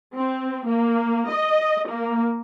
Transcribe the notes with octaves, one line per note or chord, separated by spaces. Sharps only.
C4
A#3
D#5
A#3